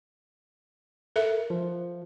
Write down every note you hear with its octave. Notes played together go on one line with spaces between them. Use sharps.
A4 A#4 E5
F3